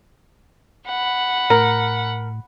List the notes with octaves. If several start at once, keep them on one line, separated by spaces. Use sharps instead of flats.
F#5 B5
A2 A#4